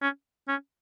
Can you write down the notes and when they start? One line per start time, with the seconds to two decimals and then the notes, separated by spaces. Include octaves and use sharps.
0.02 C#4
0.48 C#4